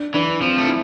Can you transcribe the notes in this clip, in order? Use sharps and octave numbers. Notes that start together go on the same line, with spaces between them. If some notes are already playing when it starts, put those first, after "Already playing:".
Already playing: D4
E3 D4
F3 C4
A3
E4